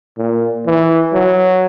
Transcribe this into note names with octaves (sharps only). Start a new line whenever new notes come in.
A#2
E3
F#3